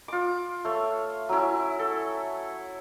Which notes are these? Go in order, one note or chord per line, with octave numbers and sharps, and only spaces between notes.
F4 D6
A3 C#5
F#3 C#4 E4
A4